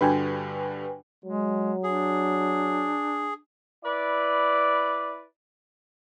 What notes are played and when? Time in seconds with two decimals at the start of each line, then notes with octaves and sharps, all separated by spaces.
0.01 G2 D3 G3 D4 F#4 B4 G5 G#5
1.25 F#3 G#3
1.83 D4 G#4
3.84 E4 B4 D5